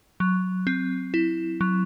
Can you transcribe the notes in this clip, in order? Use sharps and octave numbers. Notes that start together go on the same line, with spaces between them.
F#3
C4
E4
F#3